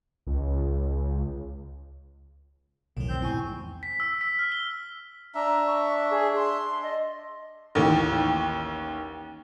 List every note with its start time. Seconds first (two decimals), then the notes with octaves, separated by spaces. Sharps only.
0.27 C#2
2.97 B1 E2 A2 D#3 F#3
3.09 C4 G6
3.22 E2 G#2 B2 E4 G#5 C#6
3.83 B6
4.00 E6
4.21 B6
4.39 F6
4.52 G7
5.35 D4 E5 A#5
5.67 C#6
6.11 G#4
6.36 C6
6.83 D5 D#5
7.75 A1 D#2